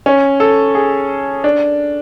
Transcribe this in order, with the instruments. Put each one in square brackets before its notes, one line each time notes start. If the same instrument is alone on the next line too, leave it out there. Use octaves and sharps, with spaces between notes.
[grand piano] C#4
A4
G#4
D4